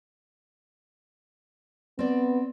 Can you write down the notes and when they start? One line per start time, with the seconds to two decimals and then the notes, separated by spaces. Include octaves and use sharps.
1.99 B3 C4 D5